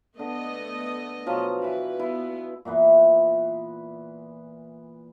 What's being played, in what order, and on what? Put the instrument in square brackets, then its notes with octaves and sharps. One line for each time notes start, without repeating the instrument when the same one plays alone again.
[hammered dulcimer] D3 [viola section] A3 B3 D#5
[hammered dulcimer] B2 F3 F#3
[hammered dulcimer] E3 E4 [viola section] B4
[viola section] B3 [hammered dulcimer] E4
[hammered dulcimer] A#2 E3 B3 B4